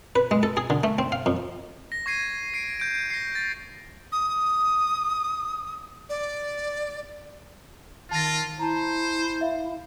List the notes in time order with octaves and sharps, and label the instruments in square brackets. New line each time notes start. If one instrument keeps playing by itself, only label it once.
[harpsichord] B4
G#3
A4
G#4
D3
A3
C4
F5
F2
[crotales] A#6
C#6 G#6 C7 D#7
C7 D7
G6 D7
A#6 C7
A6
[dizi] D#6
D5
[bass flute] D#3 [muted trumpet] F4 [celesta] A5 A6 A#6
[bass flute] E4 [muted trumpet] C5 [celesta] A5 A#5
[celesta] E5 F5